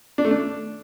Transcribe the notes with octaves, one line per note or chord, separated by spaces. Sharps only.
D4
A3
D4